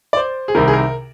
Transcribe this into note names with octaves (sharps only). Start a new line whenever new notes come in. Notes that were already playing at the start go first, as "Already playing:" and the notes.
D5
C5
G#4
C2 C3 D#3 A#4
G#4
A#4